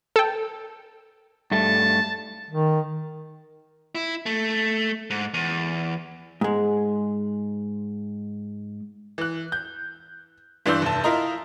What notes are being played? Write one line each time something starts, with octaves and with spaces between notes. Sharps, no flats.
A4 G5
G2 A3 A5
D#3
E4
A3
G#2
E2
G#2 G#3
E3 F#6
G6
G2 E3 D4 C6 E6 G6
F1 A5
E4 F4 A#4 D#5 A#5 C6